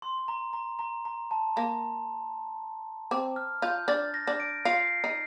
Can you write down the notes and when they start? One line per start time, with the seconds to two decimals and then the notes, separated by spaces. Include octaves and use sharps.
0.02 C6
0.18 C6
0.28 A#5
0.53 A#5
0.79 A#5
1.05 A#5
1.31 A5
1.56 A#3 A#5
3.11 C4 D6
3.36 F6
3.62 F4 G6
3.88 D4 A6
4.14 A#6
4.27 D4
4.40 D7
4.65 F4 C7
5.04 D#4